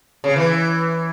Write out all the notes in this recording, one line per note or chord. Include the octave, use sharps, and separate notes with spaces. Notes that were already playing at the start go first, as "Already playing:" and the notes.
C#3
E3